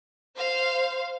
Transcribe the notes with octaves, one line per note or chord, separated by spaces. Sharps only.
C5 F5